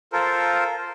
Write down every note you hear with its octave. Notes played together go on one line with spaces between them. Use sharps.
F4 A4 A#4 C5